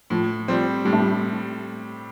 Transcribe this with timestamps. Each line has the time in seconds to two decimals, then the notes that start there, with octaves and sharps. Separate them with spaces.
0.10 A2 F3
0.48 F3 G3 C4
0.85 A2 G3
0.93 A3
1.00 G3